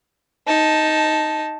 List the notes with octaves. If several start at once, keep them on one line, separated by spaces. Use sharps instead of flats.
D#4 A5